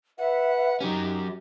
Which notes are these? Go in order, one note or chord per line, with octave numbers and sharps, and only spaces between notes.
B4 E5 F#5
F#3 C#4 D#4 G4